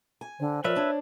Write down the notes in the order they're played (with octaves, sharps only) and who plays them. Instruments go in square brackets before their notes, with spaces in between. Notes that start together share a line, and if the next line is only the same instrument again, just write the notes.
[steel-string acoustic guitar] G#5
[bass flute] D3 [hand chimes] C5 G5
[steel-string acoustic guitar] F3 [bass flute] A#4 [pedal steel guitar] B4 E5 [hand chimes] C#5 D5
[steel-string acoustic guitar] D4 [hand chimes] C5 [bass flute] C#5